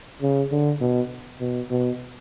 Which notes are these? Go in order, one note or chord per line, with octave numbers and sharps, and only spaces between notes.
C#3
D3
B2
B2
B2